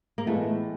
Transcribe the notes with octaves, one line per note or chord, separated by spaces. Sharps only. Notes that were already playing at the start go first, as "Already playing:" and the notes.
A#3
A2 E3 G#3 A3 B3